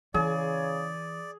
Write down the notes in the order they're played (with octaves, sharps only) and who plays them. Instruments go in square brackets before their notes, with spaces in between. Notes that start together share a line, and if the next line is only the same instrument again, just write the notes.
[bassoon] C#3 [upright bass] E3 [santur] G#4 [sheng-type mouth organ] D5